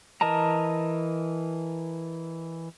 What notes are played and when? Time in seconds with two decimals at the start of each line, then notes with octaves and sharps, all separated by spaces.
0.21 E3 A#4 D#5 A5 A#5